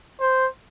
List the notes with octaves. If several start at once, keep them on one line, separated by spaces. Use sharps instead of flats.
C5